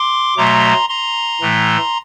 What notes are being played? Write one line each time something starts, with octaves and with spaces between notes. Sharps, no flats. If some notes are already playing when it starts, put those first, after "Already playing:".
Already playing: C6 D6
B2 F#3 A3 A#5 C6
A#5 C6
A2 E3 A3